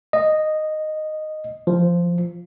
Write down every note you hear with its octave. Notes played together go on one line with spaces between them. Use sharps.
D#5
F3